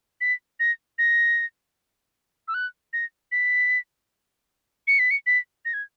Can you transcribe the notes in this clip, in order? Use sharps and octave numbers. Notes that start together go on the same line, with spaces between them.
B6
A#6
A#6
E6
F#6
A#6
B6
C#7
B6
C#7
B6
A#6
G#6